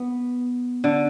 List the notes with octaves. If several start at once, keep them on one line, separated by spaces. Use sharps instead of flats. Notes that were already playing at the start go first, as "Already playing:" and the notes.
Already playing: B3
D3